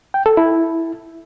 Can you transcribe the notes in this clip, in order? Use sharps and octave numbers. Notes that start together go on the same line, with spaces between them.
G5
A4
E4